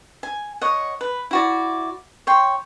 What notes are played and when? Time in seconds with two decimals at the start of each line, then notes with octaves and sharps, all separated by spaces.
0.23 G#5
0.61 C#5 D#5 F#5
1.01 B4
1.31 E4 F#4 D5
2.27 C#5 G5 C6